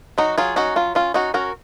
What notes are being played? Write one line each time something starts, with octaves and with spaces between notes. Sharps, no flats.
F#3 D#4 F#4
F#3 F4 G#4
C#4 D#4 F#4
F#3 F4
C#4 F4
C#4 D#4 F#4
C#4 F#4 A#4